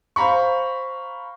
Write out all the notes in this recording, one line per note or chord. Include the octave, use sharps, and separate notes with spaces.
C5 F5 A#5 B5 C#6